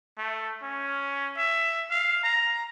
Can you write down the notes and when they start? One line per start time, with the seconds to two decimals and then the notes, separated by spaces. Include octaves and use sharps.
0.18 A3
0.63 C#4
1.37 E5
1.91 F5
2.24 A#5